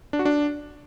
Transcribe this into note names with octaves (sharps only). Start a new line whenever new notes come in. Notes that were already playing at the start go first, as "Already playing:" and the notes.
D4
F#4
D4